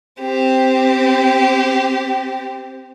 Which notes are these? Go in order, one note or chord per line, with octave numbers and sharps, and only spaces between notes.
C4 G4